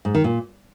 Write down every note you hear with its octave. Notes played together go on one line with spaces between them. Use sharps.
G#2
D#3
A#2